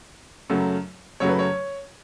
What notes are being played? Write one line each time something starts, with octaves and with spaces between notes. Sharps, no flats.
F#2 C#3 F#3 A3
F#2 C#3 F#3 A3 C#5
B4
C#5